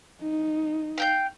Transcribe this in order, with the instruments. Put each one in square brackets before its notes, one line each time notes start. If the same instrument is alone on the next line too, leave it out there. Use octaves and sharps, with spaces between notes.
[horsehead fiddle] D#4
[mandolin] F5 G5 G6